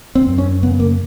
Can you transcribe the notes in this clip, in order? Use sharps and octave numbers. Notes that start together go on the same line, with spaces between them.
C4
F#2
C#4
C#3 B3
A#3